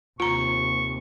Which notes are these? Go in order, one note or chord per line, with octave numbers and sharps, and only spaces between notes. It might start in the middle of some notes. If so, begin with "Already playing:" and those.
D#2 C3 F4 A#5 C#6